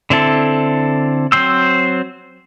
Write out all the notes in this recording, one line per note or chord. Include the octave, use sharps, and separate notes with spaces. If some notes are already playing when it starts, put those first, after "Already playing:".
D3 C4 E4 A4
F#3 C4 C5 E6